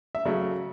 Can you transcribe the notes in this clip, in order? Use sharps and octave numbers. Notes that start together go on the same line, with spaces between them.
E5
C#3 F#3 A3